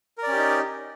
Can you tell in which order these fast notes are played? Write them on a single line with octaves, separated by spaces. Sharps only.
A#4 D5 C#4 G4 D#4